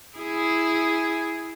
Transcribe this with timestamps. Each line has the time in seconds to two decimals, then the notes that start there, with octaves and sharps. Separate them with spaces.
0.17 E4 G#4